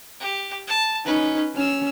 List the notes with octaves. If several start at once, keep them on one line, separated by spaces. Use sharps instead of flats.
G4
A5
C#4 D#4 B4
C#4 E6 F6